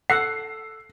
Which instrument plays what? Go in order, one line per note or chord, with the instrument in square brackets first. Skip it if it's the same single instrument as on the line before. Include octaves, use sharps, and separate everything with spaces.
[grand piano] A4 E6 [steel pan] F#5 [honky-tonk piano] C7